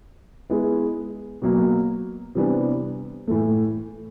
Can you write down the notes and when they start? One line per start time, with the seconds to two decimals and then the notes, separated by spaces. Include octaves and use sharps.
0.50 G#3 B3 E4
1.42 B2 F#3 A#3
2.35 C3 E3 G3 B3 D4
3.27 A2 E3 A3